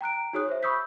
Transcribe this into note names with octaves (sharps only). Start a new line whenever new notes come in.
G5 A#5 F#6 D7
D#4 F#4 G#4 C#5 D#6 F#6
C5 E5
B5 C#6 D#6 E6 G6 B6